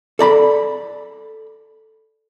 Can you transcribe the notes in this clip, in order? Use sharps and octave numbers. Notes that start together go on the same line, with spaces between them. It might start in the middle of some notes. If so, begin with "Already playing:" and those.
A4 D5 A#5 B5